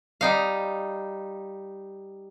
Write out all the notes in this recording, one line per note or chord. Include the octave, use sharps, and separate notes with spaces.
G3 D#4 F5